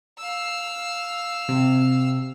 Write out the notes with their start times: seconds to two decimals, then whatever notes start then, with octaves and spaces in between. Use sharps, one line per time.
0.18 F5 E6
1.49 C3